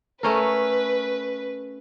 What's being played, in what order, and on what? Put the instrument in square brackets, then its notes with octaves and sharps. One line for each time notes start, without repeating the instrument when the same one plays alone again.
[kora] A3 C#4 A#4 [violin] B4